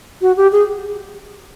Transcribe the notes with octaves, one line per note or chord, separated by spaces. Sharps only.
F#4
G4
G#4